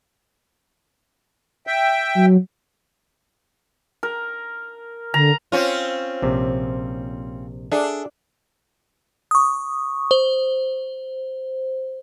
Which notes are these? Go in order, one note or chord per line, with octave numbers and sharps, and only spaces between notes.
E5 G5
F#3
A#4
D3 A#5
C4 C#4 F4
A#1 C3
D4 G#4 A4 E5
C#6 D#6
C5